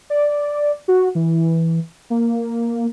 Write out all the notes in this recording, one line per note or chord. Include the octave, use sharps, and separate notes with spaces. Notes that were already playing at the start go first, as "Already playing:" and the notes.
D5
F#4
E3
A#3